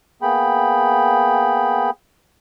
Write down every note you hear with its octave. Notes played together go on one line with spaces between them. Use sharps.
A#3 B3 G#4 G5 B5